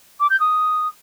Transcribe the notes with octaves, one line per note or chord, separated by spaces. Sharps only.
D6
G6
D#6